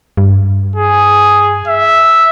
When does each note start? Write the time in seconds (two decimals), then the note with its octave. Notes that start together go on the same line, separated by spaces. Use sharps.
0.17 G2
0.76 G#4
1.68 E5